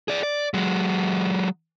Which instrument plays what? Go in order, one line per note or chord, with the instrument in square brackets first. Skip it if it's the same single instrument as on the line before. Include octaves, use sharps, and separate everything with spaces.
[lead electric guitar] G#4 D5
D5
F#3 G#3